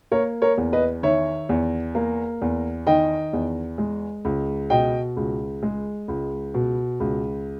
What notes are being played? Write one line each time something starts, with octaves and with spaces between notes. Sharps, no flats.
A#3 A#4 C#5
A#4 C#5
E2
B4 D#5
D#3 C#5 E5
E2
A#3
E2
D#3 D#5 G5
E2
G#3
C#2
B2 D#5 G5
C#2
G#3
C#2
B2
C#2